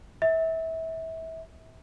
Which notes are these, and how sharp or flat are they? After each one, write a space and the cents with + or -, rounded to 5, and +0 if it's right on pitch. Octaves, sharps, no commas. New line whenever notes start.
E5 -25